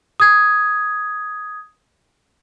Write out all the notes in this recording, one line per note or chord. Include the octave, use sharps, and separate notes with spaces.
D#6 G#6